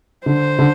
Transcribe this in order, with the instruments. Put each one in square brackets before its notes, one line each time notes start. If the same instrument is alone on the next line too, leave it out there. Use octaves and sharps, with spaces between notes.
[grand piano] D3 [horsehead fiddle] C5
[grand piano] D3